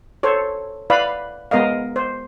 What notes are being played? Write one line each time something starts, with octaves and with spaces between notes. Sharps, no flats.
A4 C5 C#5
E4 B4 D5 F5 B5
G#3 B3 A#4 D#5 F5
C5